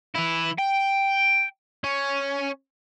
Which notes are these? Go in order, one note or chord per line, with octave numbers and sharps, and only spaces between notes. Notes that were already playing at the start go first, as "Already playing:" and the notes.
E3 E4
G5
C#4